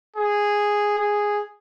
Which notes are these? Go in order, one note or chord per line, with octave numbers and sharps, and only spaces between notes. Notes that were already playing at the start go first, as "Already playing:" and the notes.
G#4
G#4